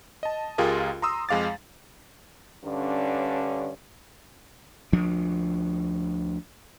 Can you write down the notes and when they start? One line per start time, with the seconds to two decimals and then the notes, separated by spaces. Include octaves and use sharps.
0.23 D#5 A5
0.58 C#2 F4 G4 G#4 A#4
1.02 A#5 C6 D#6 E6
1.29 F2 G#3 F5 D6 A6
2.64 G2 D3 C#4
4.92 D2 F3 D4